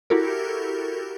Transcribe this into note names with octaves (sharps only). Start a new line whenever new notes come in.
E4 F#4 G4 A4 A#4